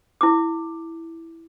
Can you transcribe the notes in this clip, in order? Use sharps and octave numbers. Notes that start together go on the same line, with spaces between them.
E4 D6